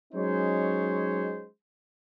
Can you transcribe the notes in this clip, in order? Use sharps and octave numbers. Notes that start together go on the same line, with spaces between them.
F#3 G#3 C#4 D#4 C5 C#5